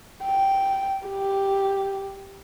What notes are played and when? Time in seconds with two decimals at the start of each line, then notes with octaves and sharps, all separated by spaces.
0.25 G5
1.08 G4